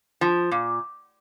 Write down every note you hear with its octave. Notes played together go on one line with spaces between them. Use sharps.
F3
A#2